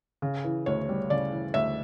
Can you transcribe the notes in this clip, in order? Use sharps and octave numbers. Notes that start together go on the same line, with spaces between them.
C#3
E3
D2 C#5
G3
C#3 D5
E3
D2 E5